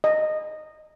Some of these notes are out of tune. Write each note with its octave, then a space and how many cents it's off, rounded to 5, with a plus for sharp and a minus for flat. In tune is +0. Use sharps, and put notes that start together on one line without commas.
D#5 -10